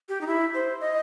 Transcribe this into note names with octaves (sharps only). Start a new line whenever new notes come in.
G4
D#4
E4
C5
D#5